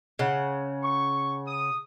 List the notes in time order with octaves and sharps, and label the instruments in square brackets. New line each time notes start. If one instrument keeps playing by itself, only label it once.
[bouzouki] C#3 F#5
[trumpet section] C#6
D#6